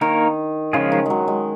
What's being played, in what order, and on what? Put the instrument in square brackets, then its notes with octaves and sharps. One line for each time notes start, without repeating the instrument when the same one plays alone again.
[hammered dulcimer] D#3 [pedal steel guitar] A#3 D#4 A#4 C#5
[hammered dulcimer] C#3 [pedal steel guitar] F3 G#3 C#4 F4 G#4
[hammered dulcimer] D#3
F#3 G#3
G#3